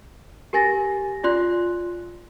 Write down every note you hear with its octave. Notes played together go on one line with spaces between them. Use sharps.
G4 A#4 G#5 A6 A#6
F4 D5 C6 F#6